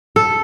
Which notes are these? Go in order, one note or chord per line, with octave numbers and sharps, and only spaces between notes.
A4